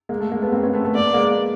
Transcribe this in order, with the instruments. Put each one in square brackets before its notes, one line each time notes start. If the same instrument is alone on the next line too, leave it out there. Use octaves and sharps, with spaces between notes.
[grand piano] G#3 A#3
A3
G#3 A#3
A3 B3
A#3 C4
B3 C#4
A3 B3
A3 B3
[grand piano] A#3 [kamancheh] D5
[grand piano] B3
G#3 A#3